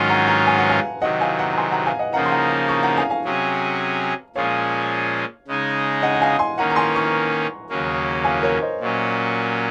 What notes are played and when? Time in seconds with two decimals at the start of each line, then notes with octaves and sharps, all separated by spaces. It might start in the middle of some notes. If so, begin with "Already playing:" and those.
Already playing: G#2 D#3 F#3 C#4 F4 G#5 C6
0.09 F#5 A#5
0.28 F#5 A#5
0.47 G#5
0.58 F#5
0.70 F5 G#5
1.02 C3 D#3 F#3 D#5 F#5
1.21 F5 G#5
1.39 F#5 A#5
1.52 A#5
1.58 G#5 C6
1.71 F#5 A#5
1.86 F5 G#5
1.99 D#5 F#5
2.13 C#3 F3 A#3 D#4 F#5 A#5
2.25 C6
2.31 F#5 A#5
2.69 A#5 C#6
2.83 F#5 A#5
2.97 F5 G#5
3.10 F5 G#5
3.24 C3 F#3 C#4 G#4
4.36 A#2 F3 G#3 C#4 G#4 C#5 F5
5.48 C#3 G#3 D#4 G#4
6.02 D#5 F#5
6.15 F#5
6.21 F5 G#5
6.39 G#5 C6
6.58 D#3 A#3 C#4 F#5 A#5
6.70 A#5
6.76 G#5 C6
6.95 A#5 C#6
7.70 D#2 C#3 F#3 A#3 C#4
8.24 F5 G#5
8.43 A#4 C#5
8.62 C5 D#5
8.81 A#2 F#3 C#4